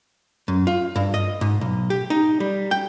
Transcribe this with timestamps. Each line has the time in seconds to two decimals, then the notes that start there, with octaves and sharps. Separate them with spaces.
0.48 F#2
0.67 F4
0.96 G2
1.14 D#5
1.41 G#2
1.61 B1
1.90 G4
2.10 D#4
2.40 G3
2.71 G5